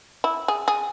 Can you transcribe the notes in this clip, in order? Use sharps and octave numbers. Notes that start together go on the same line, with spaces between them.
E4
G#4
G#4